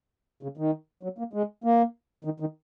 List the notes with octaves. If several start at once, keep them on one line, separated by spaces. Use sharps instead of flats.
C#3
D#3
F#3
A#3
G#3
A#3
D#3
D#3